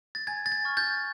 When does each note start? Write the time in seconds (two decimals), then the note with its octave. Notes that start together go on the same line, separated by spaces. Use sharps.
0.15 A6
0.27 G#5 G#6
0.46 A6
0.52 G#6
0.65 C#6 F6
0.77 G6 A6